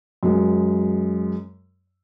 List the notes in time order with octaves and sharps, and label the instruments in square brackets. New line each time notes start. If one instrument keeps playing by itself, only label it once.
[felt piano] F#2 G#3